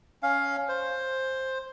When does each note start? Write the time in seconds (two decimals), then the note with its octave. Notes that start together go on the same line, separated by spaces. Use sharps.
0.23 C#4 F5
0.69 C5